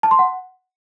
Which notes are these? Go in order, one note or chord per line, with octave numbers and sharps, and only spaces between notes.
A5
C6
F#5